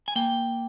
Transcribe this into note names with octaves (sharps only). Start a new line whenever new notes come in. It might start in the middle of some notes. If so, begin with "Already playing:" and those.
G#5
A#3 G5